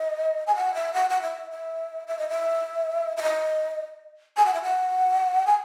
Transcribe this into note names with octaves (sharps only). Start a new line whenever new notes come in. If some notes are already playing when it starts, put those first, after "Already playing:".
Already playing: D#5
G#5
F#5
E5
F#5
F#5
E5
E5
E5
D#5
E5
E5
D#5
G#5
F#5
E5
F#5
G#5